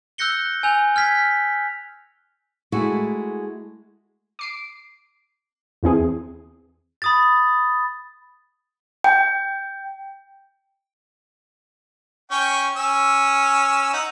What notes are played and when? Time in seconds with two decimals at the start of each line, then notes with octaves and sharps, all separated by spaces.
0.18 E6 F#6 G6 A#6 C#7 G7
0.63 G#5 E6 G6 F7
0.96 F6 G#6 B6
2.72 G#3 A3 E4 F#4
4.39 D6 C7 D7
5.83 E2 E3 C4 G#4
7.02 B5 D#6 A6
9.04 G5
12.31 C#4 G5 C#6
12.77 C#4 E6
13.93 D#4 F#5